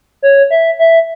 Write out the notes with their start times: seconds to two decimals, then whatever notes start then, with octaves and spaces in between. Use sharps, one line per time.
0.22 C#5
0.51 E5
0.79 E5